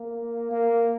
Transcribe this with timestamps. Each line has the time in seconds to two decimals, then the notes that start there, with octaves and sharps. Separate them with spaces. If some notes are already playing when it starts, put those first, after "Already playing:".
Already playing: A#3
0.51 A#3